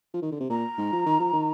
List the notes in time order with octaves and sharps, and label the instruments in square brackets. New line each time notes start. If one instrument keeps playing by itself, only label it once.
[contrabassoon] F3
D#3
D3
C3
[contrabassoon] A#2 [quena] A#5
[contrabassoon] G#2
F3
D#3
F3
D#3